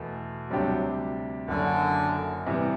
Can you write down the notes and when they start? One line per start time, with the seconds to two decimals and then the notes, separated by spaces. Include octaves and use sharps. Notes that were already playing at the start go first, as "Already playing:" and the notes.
Already playing: E2 B2 A3
0.50 D2 C3 F#3 G3 D4 G4
1.48 F#1 F#2 D3 F#3
2.46 C3 E3 G3 B3